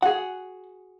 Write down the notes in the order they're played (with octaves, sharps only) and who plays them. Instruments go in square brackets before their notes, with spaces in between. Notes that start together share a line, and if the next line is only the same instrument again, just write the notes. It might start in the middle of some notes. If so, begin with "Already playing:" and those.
[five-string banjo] F#4 G#4 [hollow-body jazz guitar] F#5